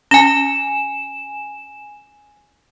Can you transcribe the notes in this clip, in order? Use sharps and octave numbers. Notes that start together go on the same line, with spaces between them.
C#4 G#5 E7